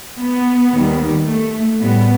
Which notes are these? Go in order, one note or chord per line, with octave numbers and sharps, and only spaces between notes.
B3
D#2 D#3 G3
A3
A2 G3 B3